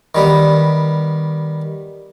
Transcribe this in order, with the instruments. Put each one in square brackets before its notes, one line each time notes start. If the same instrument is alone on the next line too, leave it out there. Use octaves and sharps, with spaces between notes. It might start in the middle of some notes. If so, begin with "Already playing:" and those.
[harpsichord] D#3 G3 B3